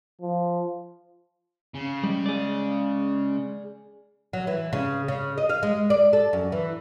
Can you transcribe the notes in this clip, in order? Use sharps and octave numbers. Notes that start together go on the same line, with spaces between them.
F3
C#3
G3 G#3
G#4 D5
F#3
E3
C#3
C#3
D#5
F5
G#3
D5
A4
F#2
E3